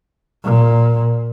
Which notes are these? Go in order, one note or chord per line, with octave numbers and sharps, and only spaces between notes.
A#2